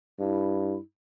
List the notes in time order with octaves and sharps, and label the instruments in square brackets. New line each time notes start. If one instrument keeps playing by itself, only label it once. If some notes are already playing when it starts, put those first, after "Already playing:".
[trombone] G2 [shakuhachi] E4